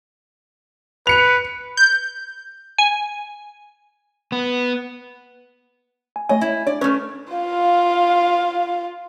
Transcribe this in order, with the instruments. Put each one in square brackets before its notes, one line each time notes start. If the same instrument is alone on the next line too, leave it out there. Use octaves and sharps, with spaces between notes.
[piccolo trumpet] B4 [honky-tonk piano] C#7 F7
[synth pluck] G6
G#5
[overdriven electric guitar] B3
[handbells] G#5
[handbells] A3 C#5 G#5 [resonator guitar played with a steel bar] D#5
[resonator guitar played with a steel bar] E4
[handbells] D4 C#5 [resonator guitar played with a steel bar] D5
[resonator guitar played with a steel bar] A3 C#4 [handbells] B4 F6
[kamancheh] F4 F5